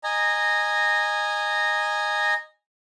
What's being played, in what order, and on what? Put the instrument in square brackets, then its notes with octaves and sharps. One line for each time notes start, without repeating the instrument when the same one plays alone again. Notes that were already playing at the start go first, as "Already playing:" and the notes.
[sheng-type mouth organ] D#5 G#5 A#5